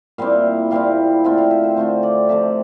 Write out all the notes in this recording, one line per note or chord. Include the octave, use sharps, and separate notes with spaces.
A#2 G3 C4 E4 F5
A#2 G3 C4 E4 F5
D3 A3 C4 F4 G5
F5
E5
C5
D3 A3 C4 F4 C5
D5
C3 F3 A3 E5